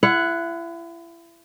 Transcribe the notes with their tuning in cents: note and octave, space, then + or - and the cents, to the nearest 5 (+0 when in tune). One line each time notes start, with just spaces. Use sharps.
E4 +35 F#5 +0